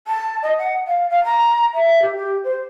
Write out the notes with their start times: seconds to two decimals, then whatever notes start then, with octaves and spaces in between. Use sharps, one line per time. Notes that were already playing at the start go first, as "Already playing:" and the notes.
0.07 A5
0.43 D#5
0.59 F#5
0.87 F5
1.10 F5
1.24 A#5
1.74 E5
2.02 G4
2.16 G4
2.44 C5